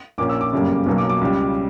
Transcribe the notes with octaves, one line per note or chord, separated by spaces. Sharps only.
A#1 A#2 A#3 C#4 D6
E6
D6
G1 F#2 C#3 G3 A#3
B1 B2 F#3 A#3
D6
D6
C#2 C#3 G3